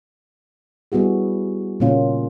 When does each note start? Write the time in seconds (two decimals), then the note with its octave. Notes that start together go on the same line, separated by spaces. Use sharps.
0.92 G3 B3 E4 F#4 G#4
1.80 A#2 C#3 A#3 C#4 F4